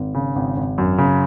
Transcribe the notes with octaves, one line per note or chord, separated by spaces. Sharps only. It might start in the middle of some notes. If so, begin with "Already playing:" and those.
Already playing: G#1
C#3
G#1
G#1
F#2
C#3